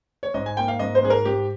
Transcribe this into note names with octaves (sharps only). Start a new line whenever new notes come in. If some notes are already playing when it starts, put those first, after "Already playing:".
C#5
G#2 D#5
G#5
A#3 G5
F5
G#2 D#5
C5
G#2 G#4
A#4
G#2 G4